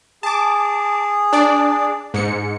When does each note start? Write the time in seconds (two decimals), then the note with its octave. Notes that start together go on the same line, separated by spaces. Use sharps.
0.23 G#4 A5 D6
1.33 D4 D5
2.14 G#2 C#7